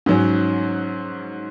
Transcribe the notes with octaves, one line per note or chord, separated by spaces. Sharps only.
G#2 F#3 C#4